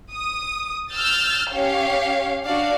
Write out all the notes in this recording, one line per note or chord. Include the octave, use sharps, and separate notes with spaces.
D#6
E6 F6 G6 A6
C#4 G4 C#5 F5
D4 F#4 D5 F5